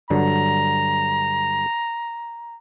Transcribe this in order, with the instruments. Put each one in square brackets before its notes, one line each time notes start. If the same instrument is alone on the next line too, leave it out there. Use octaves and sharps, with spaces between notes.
[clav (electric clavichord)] G2 D3 F#3 [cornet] A#5